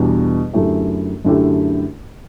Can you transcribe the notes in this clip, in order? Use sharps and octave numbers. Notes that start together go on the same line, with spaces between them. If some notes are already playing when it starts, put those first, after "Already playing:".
Already playing: E2 B2 G3 D4
F#2 D3 A3 E4 G4
F#2 D3 A3 E4 G4